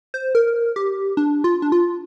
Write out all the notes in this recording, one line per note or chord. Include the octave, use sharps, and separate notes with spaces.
C5
A#4
G4
D4
F4
D4
F4